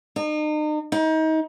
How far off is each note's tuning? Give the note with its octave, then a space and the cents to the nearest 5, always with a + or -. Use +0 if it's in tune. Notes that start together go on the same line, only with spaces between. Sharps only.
D#4 -40
D#4 +30